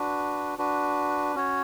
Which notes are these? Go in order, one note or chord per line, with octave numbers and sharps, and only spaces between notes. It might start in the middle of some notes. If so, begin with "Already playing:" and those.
Already playing: D4 F#4 B4
D4 F#4 B4
C#4 F#4 C#5